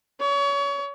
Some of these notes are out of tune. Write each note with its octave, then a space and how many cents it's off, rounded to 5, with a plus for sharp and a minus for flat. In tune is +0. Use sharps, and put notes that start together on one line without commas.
C#5 +30